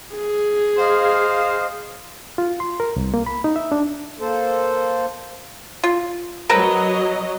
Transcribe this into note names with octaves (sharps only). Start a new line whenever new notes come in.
G#4
C5 D#5 F5
F4
C6
A#4
C2
A#3
B5
D#4
E5
D4
A#3 A4 C5
F4
F#3 C4 A#4 B4 D#5